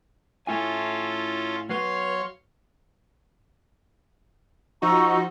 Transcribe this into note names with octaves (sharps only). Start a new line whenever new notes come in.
A2 C#4 E4 F4 A4 G#5
F#3 B4 C#5 F5 C6
F3 D#4 F#4 A#5 C#6 E6